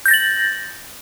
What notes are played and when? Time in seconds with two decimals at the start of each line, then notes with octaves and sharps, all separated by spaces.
0.06 G6
0.08 A#6
0.11 A6
0.14 F#7